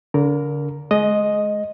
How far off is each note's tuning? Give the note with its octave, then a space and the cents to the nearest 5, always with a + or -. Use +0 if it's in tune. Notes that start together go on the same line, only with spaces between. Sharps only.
D3 -35 A#4 +0
G#3 +25 D#5 +0